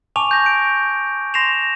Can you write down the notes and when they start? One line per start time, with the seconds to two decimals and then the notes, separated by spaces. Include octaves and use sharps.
0.16 G#5 A5 C#6 D6 F7
0.31 G6 A#6
0.46 D7
1.34 C6 A#6 C7 E7 F7